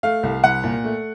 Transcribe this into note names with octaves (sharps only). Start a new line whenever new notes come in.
A3 F5
C2
C2 F#5
A#2
A3